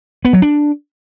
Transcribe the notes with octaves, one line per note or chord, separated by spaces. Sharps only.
B3
F#3
D4